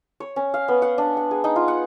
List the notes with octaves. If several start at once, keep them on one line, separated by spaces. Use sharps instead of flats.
C#5
C#4
F5
B3
F#5
D4
F#5
G#4
D#4
F4
F#5